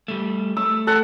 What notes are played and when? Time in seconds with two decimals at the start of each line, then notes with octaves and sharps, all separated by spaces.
0.08 G3 A3
0.57 A3 E6
0.87 A4 F#5